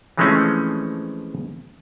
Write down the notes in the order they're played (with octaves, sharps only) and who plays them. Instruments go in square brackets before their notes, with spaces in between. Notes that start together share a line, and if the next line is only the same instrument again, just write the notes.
[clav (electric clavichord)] E3 F3 G#3 A3 C4 C#4